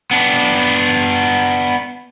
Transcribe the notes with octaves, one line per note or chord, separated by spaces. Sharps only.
B3 D4